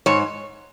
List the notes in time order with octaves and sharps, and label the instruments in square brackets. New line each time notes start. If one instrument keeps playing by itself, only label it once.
[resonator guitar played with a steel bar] G#2 C#5